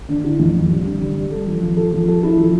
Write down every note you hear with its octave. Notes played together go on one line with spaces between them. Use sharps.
D3
E4
F2
F2
G3
D3
G3
G3
A4
F3
F3
A4
F3
A4
E4
F3